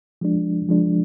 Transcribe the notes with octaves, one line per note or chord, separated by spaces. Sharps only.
F3 G#3 D4
F3 G#3 D4